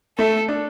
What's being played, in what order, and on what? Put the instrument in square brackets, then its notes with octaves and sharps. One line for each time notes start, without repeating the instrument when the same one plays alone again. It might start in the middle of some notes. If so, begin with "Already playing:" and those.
[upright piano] A3 [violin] A4
[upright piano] D4